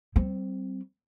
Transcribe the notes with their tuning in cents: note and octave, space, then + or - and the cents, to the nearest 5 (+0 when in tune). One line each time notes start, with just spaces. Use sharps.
G3 -35 C4 +0